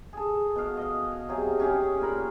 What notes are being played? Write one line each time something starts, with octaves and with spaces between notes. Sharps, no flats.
G#4 A4
B2 F5
D#5 F5
C3 F#3 G#4
C#4 G4 G#4
A#2 A#4 B5